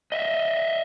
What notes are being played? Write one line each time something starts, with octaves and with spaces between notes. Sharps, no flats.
D#5 E5